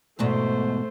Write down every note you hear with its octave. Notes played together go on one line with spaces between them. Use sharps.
E2 G#2 B2 A3 C5